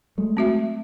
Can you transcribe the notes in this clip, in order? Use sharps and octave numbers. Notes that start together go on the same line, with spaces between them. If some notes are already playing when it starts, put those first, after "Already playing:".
F#3 G#3 A3
C4 F#4 E5